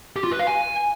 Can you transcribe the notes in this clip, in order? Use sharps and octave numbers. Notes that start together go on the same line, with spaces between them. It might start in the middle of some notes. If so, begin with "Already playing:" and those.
G4
F4
B4
F5
G#5